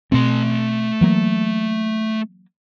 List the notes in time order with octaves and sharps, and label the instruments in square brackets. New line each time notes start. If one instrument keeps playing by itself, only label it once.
[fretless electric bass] B2 C4 [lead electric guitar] A3 C6
[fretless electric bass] E3 F#3 A#3